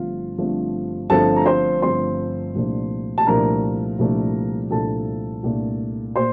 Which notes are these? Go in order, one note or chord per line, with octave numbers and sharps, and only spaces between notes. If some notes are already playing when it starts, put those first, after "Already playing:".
Already playing: G1 G2 F3 A3 C4 F4 F5
G1 G2 F3 A3 C4
G1 G2 F3 A3 C4 A4 A5
A#5
C5 C6
G1 G2 F3 A3 C4 C5 C6
C2 A#2 F3 A3 D4
A5
C2 A#2 F3 A3 D4 A#4 A#5
C2 A#2 F3 A3 D4
C2 A#2 F3 A3 D4 A4 A5
C2 A#2 A3 D4
A#2 C5 C6